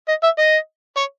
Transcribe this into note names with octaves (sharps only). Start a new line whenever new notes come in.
D#5
E5
D#5
C#5